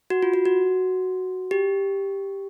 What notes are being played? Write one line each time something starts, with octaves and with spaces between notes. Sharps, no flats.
F#4
F4
F#4
F#4
G4